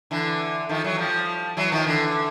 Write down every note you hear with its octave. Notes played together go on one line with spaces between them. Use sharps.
D3 E3
D#3 F3
E3 F#3
F3 G3
E3 F#3
D#3 F3
D3 E3